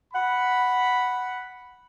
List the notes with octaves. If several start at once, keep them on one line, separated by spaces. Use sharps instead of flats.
F#5 B5